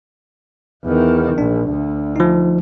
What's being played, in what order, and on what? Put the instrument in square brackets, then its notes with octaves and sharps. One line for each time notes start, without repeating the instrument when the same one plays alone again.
[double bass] E2 D#3
[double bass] A#1 [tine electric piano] D4
[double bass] D2
[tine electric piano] F3 D#4